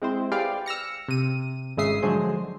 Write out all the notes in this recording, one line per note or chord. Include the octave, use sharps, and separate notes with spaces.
G#3 C4 E4 C5
G4 G#4 B4 D5 F5 G5
E6 F6 A#6 C#7
C3 D#7
G#1 C#3 G#3 E5 D#6 C7
D3 F3 F#3 G#3 G#4 C5